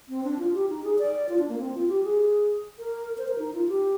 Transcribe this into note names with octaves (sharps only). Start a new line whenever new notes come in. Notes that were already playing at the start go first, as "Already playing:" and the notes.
C4
D4
F4
G4
D#4
G#4
D5
F4
D4
A#3
C4
F4
G4
G#4
A#4
C5
A#4
D#4
F4
G4